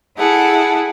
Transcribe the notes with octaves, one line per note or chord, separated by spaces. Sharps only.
E4 G#4 A4 F#5